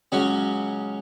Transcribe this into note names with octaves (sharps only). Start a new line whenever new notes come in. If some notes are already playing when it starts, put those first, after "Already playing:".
C#2 C#3 F#3 C#4 F#4